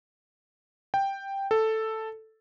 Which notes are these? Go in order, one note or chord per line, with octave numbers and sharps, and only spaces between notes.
G5
A4